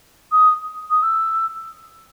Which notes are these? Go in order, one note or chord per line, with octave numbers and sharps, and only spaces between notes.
D#6
D#6
E6